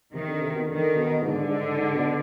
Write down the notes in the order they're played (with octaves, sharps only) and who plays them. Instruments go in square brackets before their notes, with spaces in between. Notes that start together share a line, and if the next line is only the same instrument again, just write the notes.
[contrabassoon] C3 [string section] D#3
[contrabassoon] D3
C3
B2
[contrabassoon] D3 [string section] D#3
[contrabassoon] B2
[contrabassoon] G#2 [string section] D3
[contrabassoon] G2
G#2
G#2
B2